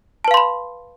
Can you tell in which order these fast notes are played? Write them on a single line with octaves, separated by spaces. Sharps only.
A5 B4 F5 C6 B5